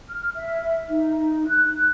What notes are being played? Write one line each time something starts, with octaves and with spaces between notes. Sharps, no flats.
F6
E5
D#4
F#6